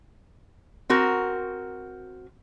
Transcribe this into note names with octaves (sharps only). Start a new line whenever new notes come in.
C4 F#4 A#4